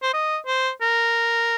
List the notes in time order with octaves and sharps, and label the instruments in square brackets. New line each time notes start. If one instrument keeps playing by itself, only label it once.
[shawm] C5
D#5
C5
A#4